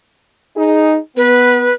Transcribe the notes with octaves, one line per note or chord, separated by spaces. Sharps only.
D#4 G#4
B3 B4